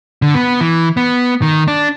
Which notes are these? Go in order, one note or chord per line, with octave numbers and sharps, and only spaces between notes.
D3
B3
E3
B3
D#3
D4